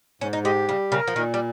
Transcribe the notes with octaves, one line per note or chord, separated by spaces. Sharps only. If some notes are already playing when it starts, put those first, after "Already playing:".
G#2 C#4
D#4
G#3 G4
C#3 G3
C#3 A#4
F3
A#2 D#3
G3